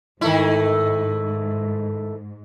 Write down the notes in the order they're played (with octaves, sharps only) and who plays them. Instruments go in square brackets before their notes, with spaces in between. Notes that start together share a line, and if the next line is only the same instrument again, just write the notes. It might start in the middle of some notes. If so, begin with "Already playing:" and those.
[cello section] G#2 [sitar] D#3 A3 E4